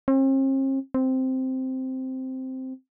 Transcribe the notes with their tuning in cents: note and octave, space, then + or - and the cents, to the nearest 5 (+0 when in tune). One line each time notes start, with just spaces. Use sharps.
C4 +45
C4 -5